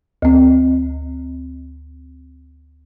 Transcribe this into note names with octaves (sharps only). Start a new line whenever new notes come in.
D2 C4